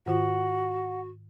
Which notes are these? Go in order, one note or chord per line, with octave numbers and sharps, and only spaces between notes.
G#2 D#3 F4 F#4 F#5